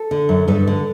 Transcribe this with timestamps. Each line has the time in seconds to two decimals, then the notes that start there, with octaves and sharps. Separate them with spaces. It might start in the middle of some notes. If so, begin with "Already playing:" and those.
Already playing: A4
0.11 D3
0.29 F#2
0.48 G2 A4
0.67 D3